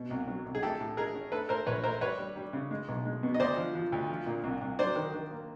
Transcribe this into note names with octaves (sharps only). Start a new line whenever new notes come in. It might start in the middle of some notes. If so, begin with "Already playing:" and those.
Already playing: B2
C2
F#3
C2
G#4
A3 G4 A4
A2
A2 G#4 A#4
C#4
A3 A4 B4
A3 A#4 C5
A#1 B4 C#5
A3 A#4 C5
G3 B4 C#5
G3
G3
C#3
G#3
B1
G#3
B2
D#5
D2 C5 D5
F3
F3
D2
F3
A#2
C2
C2
F#3 C5 D5
D#3
D#3
A#3